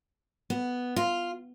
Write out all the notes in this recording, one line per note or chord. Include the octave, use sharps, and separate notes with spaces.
B3
F4